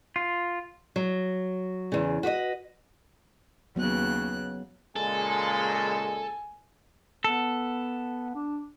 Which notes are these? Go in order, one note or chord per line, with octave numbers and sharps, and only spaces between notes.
F4
F#3
E2 C#3
F#4 B4 C#5 D#5
D#2 C#3 F#3 B3 F#6
A#2 C#3 G#3 A4 G#5
B3 A4
D4